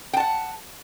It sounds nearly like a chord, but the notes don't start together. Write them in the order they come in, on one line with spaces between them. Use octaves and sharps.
G5 A5 F#5